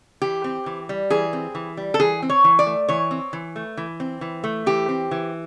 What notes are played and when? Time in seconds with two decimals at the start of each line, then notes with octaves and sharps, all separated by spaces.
0.22 E3 G4
0.44 C4
0.66 E3
0.89 G3
1.10 E3 G#4
1.33 C4
1.55 E3
1.77 G3
1.94 A4
2.00 E3 G#4
2.22 C4
2.30 C#5
2.44 E3
2.59 D5
2.66 A3
2.88 E3 C#5
3.11 C4
3.33 E3
3.56 A3
3.77 E3
4.00 C4
4.21 E3
4.44 A3
4.66 E3 G4
4.89 C4
5.11 E3